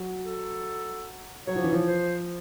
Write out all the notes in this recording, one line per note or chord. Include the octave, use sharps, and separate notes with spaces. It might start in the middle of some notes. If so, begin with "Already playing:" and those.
Already playing: F#3
A4
F#3 C#5
F3
E3
F3
C5